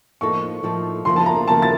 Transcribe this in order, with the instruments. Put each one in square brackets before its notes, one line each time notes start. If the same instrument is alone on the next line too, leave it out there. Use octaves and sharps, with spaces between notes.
[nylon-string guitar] A2 F3 A#3 D#4 A4 [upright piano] C#6
[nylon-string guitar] A2 F3 A#3 D#4 A4
[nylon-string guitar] D#2 C#3 F3 A#3 [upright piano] C6
[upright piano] A5
A#5
[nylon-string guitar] D#2 C#3 F3 A#3 [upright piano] A5
[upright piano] A6